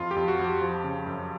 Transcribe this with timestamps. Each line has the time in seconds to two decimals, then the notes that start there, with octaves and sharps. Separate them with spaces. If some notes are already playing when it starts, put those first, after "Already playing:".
Already playing: F2 F4
0.11 G4
0.16 F2
0.28 F#4
0.39 F2
0.44 G4
0.62 F3
0.84 C#3
1.07 F#2